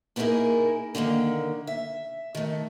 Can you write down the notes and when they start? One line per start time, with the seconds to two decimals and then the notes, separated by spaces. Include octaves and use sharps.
0.16 A#3 B3 D#4 E4 G#4 A#4
0.95 D3 D#3 G#3 A#3
1.67 E5
2.35 D#3 A3